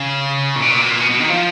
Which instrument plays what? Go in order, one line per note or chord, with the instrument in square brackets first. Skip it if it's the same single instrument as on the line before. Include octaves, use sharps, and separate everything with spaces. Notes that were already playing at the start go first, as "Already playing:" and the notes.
Already playing: [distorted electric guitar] C#3
A#2
B2
A#2
B2
A#2
B2
B2
D#3
F3